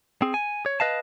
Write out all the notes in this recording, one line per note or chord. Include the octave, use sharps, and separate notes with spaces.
C4 G#4
G#5
C#5
B4 D#5 F5 A5